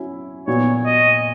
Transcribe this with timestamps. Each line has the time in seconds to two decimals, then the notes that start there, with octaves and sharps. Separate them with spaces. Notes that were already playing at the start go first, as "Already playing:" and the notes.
Already playing: F#3 C#4 E4
0.47 A#2 F#3 B3 C#5
0.86 D#5